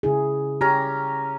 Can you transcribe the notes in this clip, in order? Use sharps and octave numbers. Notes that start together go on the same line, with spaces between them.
C#3 E4 G#4
C#4 G4 A#5